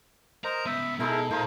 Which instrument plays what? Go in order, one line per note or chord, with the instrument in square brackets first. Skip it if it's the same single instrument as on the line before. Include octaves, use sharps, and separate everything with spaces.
[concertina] A#4 C5 D#5 [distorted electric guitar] A#5
[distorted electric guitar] C#2 B3 [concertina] E5
[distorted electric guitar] B2 [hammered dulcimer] G#3 D#4 A4 [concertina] E4 A#4
[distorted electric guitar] A#2 G#5 [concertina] A#3 [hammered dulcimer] D#4 C5